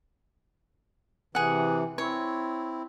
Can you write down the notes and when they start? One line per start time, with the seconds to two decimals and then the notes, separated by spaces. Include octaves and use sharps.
1.35 C3 E3 G#4 F#5
1.98 C4 E4 C#5